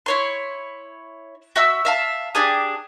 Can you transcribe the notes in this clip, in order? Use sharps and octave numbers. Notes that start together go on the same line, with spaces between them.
E4 C#5 C6
F#4 E5 E6
E5 F5 A5
D4 G4 G#4 D#6